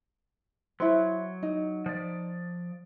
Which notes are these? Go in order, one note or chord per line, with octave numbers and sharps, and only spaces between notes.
F#3 E4 C5
D#4
F3 D5